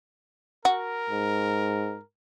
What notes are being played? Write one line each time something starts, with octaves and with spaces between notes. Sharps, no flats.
F#4 A#4
G#2